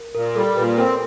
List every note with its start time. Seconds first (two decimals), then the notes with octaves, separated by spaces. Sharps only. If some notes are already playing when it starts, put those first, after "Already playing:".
Already playing: A#4
0.15 A#2 A#4
0.36 G3 A4
0.57 A#2 B4
0.78 C4 A#4